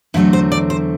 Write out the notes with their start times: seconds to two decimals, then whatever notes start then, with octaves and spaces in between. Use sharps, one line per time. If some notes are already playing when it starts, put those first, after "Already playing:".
0.14 E2 D3 F#3 A3 C4 E4
0.33 C5
0.52 D5
0.70 C5